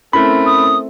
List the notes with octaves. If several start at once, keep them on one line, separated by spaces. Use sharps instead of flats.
A3 C4 C#4 E4 A#4 B5
D#6